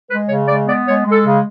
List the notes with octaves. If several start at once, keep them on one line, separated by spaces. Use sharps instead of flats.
G#3 B4
C#3 C#5
G#3 D5
B3 D5
G#3 C#5
G#3
A4
C#3